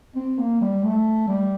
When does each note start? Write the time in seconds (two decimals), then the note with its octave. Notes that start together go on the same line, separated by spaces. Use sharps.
0.16 C4
0.38 A#3
0.61 G3
0.84 A3
1.28 G3